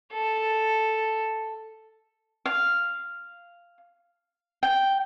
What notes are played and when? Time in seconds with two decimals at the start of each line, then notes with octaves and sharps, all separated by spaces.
0.13 A4
2.46 F5
4.63 G5